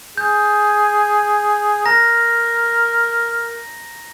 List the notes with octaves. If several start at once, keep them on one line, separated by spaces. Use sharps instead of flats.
G#4 G6
A#4 A#5 A#6